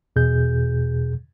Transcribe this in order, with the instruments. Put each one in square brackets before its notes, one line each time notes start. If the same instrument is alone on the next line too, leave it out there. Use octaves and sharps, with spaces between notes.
[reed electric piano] E2 B2 G#4 G6